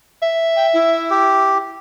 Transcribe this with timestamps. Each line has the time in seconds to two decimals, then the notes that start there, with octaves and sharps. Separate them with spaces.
0.23 E5
0.56 G5
0.73 E4
1.10 G4